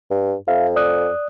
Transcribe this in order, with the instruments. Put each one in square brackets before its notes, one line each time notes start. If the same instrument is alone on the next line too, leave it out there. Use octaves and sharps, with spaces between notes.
[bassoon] G2
[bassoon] F2 [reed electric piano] E5 F5
[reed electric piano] D5 D#6 F#6